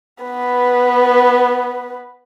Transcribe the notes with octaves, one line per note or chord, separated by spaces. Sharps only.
B3 B4